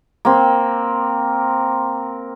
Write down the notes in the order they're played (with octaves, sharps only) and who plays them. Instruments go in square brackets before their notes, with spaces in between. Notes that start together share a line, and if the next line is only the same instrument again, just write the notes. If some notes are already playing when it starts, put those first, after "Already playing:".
[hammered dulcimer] A#3 C4